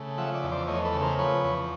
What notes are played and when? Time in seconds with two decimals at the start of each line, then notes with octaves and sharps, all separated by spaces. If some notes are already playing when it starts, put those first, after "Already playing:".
Already playing: C#3 A3
0.18 F3 E5 F#5
0.35 D5 E5
0.43 E2
0.52 C5 D5
0.68 A3 C#5 D#5
0.85 A4 B4
0.94 C#3
1.02 A#4 C5
1.19 F3 B4 C#5
1.44 E2